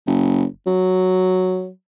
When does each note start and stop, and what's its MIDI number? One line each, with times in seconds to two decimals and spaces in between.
0.07 0.44 30
0.67 1.69 54